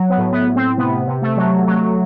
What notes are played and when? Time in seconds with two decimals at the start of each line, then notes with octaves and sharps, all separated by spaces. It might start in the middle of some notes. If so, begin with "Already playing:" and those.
Already playing: F#3
0.10 B3
0.18 A2
0.32 B3
0.48 A2
0.56 C4
0.78 C3 B3
1.07 C3
1.22 A3
1.37 F#3
1.67 F#3